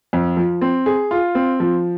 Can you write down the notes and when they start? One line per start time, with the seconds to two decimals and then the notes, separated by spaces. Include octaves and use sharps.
0.13 F2
0.37 F3
0.61 C4
0.86 G#4
1.11 F4
1.35 C4
1.60 F3